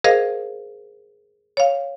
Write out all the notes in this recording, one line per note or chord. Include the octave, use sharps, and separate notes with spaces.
G#4 A#4 C5 D#5 F5
C#5 F5